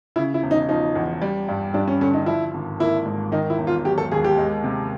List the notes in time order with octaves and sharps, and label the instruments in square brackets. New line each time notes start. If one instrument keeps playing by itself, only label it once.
[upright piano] C#3 [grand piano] E4
[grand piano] E4
[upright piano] E1
[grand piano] D#4
[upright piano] F3 [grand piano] D#4
[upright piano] E2
G3
G2
[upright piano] G2 [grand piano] D4
[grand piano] C#4
[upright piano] D3 [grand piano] C#4
[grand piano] D#4
[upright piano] F3 [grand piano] E4
[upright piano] G#1
[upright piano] A#3 [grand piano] E4
[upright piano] G#2
[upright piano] D#3 [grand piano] D#4
[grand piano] E4
[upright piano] E1
[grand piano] F4
[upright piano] F#3 [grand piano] G4
[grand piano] A4
[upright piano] D#2 [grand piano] G#4
[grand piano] G4
[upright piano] G#3
C3